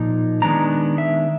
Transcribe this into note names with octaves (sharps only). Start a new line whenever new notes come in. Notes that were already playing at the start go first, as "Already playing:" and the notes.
Already playing: A#2 F3 A#3 D#4
D#3 G#3 B3 D4 A#5
E5